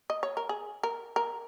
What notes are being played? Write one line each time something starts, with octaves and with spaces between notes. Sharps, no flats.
D#5
C#5
A#4
G#4
A#4
A#4